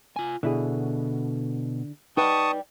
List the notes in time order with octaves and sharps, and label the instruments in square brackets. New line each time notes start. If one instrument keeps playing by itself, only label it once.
[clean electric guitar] F4 G#5
[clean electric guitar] B2 [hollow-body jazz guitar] D3 E4 G#4
[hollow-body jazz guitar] D#4 B4 F#5 [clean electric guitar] D5 G5 [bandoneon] A5 C#6 D#6